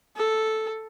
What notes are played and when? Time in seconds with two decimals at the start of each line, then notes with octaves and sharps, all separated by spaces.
0.16 A4